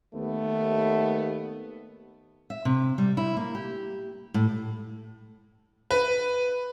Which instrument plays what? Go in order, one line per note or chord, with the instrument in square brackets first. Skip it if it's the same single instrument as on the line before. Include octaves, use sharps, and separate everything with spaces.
[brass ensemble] D#2 B3 [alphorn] A3
[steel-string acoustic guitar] E5
C3
G3
E4
A#3
G4
A2
[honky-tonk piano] B4